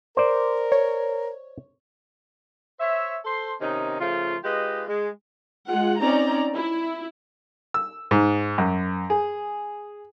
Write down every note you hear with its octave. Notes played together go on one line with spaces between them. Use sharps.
A#4 C5 D5
C#5
C5 C#5 E5
A4 C5 C6
C3 D#3 C#4 D#4
C#3 F3 A3 F4
G#3 F4 G4 B4 D#5
G#3
G#3 F4 F#5
C4 C#4 D#4 D5 A#5
E4
E6
G#2
F#2
G#4